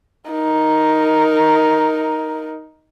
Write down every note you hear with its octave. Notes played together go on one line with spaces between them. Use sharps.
D#4 A#4